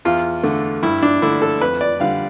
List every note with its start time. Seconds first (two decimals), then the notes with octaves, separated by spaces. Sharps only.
0.05 E2 F4
0.43 D3 A3
0.83 G2 E4
1.02 D4
1.22 D3 A3 E4
1.42 A4
1.61 F2 B4
1.81 D5
2.00 D3 G3 F5